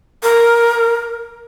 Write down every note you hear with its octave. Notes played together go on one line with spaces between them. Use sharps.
A#4